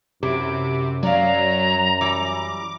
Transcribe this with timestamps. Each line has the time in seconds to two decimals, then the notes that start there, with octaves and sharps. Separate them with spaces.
0.23 F#2 C3 E4 D6
1.03 F#3 D5 F5 A#5
2.01 E3 G3 D6